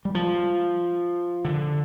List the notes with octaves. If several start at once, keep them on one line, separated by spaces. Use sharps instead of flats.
G3
F3
D3